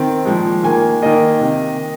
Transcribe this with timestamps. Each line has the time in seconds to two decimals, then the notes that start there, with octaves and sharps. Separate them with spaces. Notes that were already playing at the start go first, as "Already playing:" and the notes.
Already playing: D#3 C4
0.25 A#2 F3 G#3
0.63 D#3 A#3 G#5
1.02 D#3 A#3 D#5
1.41 C3 D#3